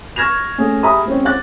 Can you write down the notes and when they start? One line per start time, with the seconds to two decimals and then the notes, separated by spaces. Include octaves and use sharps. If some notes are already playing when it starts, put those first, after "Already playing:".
0.16 C#6 F6 G#6 A#6 E7 F7
0.58 A3 C#4 G#4
0.83 G4 G#4 E5 A#5 B5 D#6
1.05 G#3 C4 C#4
1.25 F#5 D6 F#6 A6